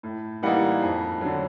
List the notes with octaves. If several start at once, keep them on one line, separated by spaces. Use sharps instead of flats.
A2
E3 G3 A#3 D#4 F#5
F2
D3 F#3